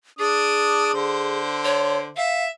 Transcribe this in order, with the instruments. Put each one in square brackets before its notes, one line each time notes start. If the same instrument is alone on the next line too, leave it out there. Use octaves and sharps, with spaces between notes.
[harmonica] D4 D#6 [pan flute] G#4
[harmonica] D3 C5
[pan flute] C#5
[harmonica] E5 [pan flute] F5